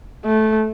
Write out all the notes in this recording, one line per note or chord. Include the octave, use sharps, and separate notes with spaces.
A3